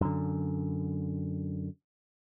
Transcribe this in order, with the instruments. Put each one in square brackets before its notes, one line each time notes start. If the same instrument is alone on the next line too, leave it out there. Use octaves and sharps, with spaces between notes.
[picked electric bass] F#2 D3